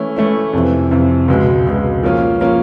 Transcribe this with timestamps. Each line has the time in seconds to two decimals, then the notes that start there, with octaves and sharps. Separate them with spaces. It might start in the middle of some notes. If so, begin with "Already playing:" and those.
Already playing: E3 A3 C#4 E4
0.16 E3 A3 C#4 E4
0.53 F2 C3 E3
0.91 F2 C3 E3
1.28 C#2 B2 G#3
1.67 C#2 B2 G#3
2.03 F3 A#3 C#4 F4
2.41 F3 A#3 C#4 F4